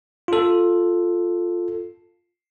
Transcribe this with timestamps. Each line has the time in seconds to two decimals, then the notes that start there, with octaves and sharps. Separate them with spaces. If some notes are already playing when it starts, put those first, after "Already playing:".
0.28 F4 A4